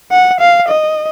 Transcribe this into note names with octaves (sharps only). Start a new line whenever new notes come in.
F#5
F5
D#5